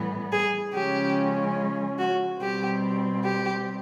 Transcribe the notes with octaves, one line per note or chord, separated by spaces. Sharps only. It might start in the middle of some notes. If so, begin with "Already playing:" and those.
Already playing: A2 E3 G3 B3
G#4
C#3 F3 G#3 C#4 G4
F#4
B2 G3 C4 G4
G4